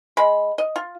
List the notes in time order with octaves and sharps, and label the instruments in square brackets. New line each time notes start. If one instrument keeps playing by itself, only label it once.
[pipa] G#3 B5
D#5
F4